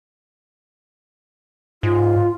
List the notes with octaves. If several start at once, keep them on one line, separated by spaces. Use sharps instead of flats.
G#2 F4